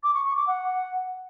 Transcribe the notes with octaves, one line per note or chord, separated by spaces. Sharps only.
D6
C#6
C#6
D6
F#5